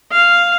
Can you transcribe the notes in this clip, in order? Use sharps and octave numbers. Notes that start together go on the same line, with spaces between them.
F5